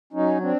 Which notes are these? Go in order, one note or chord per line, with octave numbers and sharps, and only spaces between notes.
F#3 C#4 D#4
C4 D4